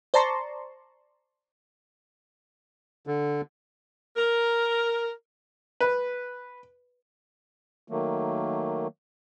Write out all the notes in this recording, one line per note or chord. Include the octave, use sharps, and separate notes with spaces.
C5 D5 A5 A#5 C6 C#6
D3
A#4
B4
D#3 F#3 A3 A#3